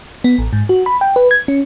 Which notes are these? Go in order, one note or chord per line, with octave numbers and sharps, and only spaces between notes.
B3
A1
G#2
F#4
B5
G5
B4
G#6
C#4